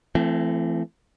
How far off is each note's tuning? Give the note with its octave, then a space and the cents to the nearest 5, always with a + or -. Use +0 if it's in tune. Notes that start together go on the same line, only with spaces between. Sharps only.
E3 +40 A3 +0 C4 -10